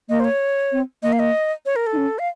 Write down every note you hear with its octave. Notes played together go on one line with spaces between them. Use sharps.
A#3 D#5
C5
C#5
C4
A#3 D#5
F5
D#5
C#5
A#4
A4
D#4
C#4
F5